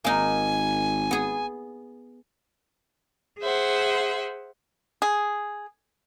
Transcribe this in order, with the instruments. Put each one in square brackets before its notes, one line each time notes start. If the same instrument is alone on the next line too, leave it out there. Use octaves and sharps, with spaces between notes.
[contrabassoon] G#1 [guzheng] A#3 D#4 [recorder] G#5
[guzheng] B3 G#4
[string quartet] G#4 C5 E5 F#5
[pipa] G#4